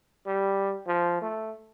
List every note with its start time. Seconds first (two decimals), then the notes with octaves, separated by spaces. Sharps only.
0.26 G3
0.87 F3
1.22 A3